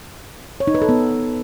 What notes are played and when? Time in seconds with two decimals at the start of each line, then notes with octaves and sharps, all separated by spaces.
0.60 C#5
0.67 D#4
0.75 B4
0.82 A4
0.89 B3